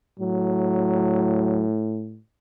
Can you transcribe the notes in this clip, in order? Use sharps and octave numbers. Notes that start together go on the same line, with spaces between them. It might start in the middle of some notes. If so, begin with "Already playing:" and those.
A2 F#3